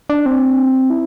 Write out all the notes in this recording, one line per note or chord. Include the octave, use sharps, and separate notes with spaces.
D4
C4
E4